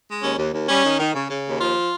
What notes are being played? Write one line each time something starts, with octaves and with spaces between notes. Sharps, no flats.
G#3
D#2 C#4
D#2
D#2
G3 C#4
D#3
D#3
C#3
C#3
D#2
F3 F4